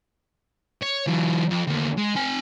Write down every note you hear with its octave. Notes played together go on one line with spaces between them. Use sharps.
C#5
E3 F#3
F2
D2 A#3
G#3
C4 G#5